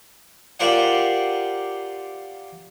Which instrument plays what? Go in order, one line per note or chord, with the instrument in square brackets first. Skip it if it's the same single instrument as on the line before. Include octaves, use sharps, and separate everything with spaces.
[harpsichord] F4 G4 A#4 C5 D5 F#5